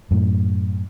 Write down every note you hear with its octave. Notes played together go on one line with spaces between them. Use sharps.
F#2 A2